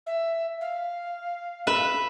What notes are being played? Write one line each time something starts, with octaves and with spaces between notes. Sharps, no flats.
E5
F5
B4 E5